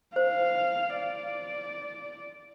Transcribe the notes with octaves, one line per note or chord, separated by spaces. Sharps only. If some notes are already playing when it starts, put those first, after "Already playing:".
C5 F5
D5